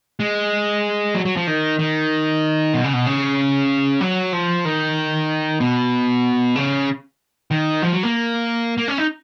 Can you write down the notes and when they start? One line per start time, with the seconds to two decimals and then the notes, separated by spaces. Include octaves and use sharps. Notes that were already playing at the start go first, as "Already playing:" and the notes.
0.20 G#3
1.15 F#3
1.25 F#3
1.36 F3
1.47 D#3
1.79 D#3
2.74 B2
2.84 C#3
2.93 B2
3.06 C#3
4.01 F#3
4.33 F3
4.65 D#3
5.60 B2
6.55 C#3
7.51 D#3
7.82 F3
7.93 F#3
8.03 A#3
8.78 A#3
8.88 C#4
8.98 D#4